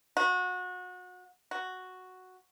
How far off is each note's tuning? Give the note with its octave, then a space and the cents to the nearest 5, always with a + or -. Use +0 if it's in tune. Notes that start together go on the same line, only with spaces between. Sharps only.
F#4 -30
F#4 +0